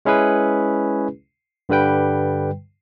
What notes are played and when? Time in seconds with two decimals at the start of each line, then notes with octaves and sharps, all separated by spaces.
0.05 G#3 C#4 E4 G#4 B4
1.69 G2 D3 G3 B4 G5